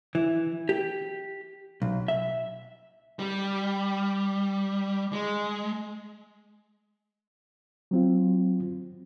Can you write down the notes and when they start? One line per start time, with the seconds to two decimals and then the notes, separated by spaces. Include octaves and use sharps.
0.15 E3
0.69 G4
1.82 B1
2.08 E5
3.19 G3
5.12 G#3
7.91 F#3 C4 F4